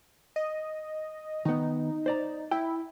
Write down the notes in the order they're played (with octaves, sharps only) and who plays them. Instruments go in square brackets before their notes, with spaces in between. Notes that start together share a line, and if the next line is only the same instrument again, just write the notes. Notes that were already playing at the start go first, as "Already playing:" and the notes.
[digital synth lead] D#5
[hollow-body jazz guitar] D#3 B3 [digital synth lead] D#4
[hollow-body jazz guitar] C5 D5 A#5
[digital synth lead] E4 [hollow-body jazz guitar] G5